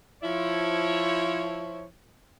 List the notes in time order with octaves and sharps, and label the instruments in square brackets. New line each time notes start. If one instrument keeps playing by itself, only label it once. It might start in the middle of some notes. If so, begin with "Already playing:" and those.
[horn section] F3 E4 C#5